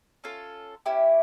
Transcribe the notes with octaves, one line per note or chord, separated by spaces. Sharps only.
C#4 F4 A4
C#4 E4 G4